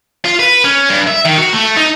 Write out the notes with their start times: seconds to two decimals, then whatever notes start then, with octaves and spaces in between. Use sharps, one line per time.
0.24 F4
0.39 B4
0.64 C#4
0.90 G2
1.08 E5
1.25 D#3
1.38 F#4
1.53 A3
1.77 D#4